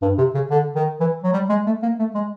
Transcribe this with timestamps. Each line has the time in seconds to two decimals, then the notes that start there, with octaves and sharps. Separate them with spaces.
0.02 G2
0.18 C3
0.34 C#3
0.50 D3
0.75 D#3
1.00 E3
1.23 F#3
1.33 G3
1.49 G#3
1.66 A3
1.82 A#3
1.99 A3
2.15 G#3